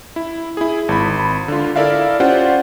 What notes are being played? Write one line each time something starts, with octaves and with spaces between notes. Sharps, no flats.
E4
E4 G#4
G#1 B5
D3 F4
E4 A4 A#4 D5 E5 F5
C#4 F4 G4 C5 D5 F#5